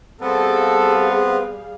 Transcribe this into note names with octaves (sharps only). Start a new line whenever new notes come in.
G3 B3 C4 G#4 A4 B4 F5